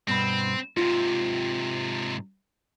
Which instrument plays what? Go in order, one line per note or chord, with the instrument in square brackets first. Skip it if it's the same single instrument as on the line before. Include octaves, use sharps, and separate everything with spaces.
[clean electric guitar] G2 B2 B5 [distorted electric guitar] C4
[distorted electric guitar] G#2 C3 [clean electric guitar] F4